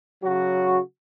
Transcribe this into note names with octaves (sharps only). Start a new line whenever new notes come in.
C#3 F#3 F#4